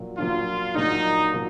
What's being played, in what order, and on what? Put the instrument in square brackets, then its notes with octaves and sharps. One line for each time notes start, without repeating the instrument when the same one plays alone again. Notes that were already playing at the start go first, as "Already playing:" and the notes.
Already playing: [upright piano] A#1 A#2 F#3
[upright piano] A#1 A#2 F#3 [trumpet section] F4
[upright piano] A#1 A#2 F#3 [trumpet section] D#4
[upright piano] A#2 F#3